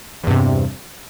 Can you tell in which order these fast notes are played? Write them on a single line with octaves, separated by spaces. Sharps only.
E2 G2 C3